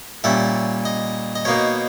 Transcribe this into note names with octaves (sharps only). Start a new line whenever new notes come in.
A#2 G3 C#4 E5
D#5
D#5
B2 A#3 D#4 C#5